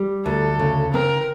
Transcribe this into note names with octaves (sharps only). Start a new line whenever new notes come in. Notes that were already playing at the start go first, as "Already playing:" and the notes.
Already playing: G3
D2 A4
C#3
C4 A#4